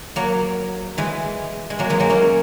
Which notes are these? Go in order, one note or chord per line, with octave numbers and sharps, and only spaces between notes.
F#3 A#3
E3 G#3
G#3
F#3 A#3
E3 G#3
F#3 A#3
A#3 C#4